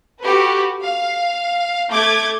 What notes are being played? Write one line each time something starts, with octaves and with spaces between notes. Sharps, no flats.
F#4 G4 A4 B4
F5
A3 D6 G6 G#6